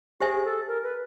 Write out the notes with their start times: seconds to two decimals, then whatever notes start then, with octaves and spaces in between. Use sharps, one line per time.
0.20 G4 G#4 C5 E5 G#5
0.44 A4
0.67 A#4
0.83 B4